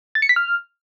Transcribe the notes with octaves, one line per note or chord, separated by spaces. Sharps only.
A6
C#7
B6
F6